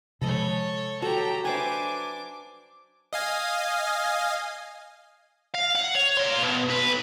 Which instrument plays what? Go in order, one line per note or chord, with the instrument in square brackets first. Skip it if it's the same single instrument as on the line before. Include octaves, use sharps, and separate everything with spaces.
[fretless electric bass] C3 F3 G#3 [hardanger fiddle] A4 C#5 [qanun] D#5 A#5 B5
[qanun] F#3 [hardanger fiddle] G4 A#5 [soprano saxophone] A4
[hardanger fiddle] D4 D6 [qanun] B4 C5 E5 [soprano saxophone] G#5
[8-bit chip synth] D#5 F5 G#5
[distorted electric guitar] F5
F#5
C#5
A#3 C6
B2
B1 B4